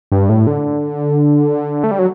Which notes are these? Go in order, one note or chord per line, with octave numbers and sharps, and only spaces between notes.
G2
A2
D3
A3
G3
F#3